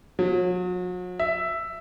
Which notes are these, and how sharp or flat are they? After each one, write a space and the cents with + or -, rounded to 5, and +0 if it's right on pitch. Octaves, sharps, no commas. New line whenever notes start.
F#3 -40
E5 +5